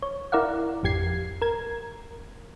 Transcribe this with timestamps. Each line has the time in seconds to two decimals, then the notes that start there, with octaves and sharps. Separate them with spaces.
0.02 C#5
0.32 E4 A#4 D5 F5 F#5
0.83 G#1 F2 G4 G#6 C7
1.42 A#4 G#6